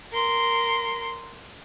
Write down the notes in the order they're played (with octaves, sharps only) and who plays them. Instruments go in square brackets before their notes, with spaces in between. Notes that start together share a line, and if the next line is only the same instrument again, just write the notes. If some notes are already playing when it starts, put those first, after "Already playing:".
[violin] A#4 C6